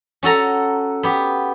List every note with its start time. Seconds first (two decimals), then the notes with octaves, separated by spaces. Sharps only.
0.23 C#4 F#4 A4 A#5
1.03 B3 G4